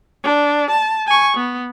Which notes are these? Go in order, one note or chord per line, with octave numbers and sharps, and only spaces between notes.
D4
A5
G#5 C#6
B3